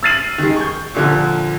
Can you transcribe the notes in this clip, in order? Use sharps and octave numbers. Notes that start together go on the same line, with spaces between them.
E6 F6 A6 C7 D#7 F#7
D#3 G#3
C#6 G6
A#2 D3 F3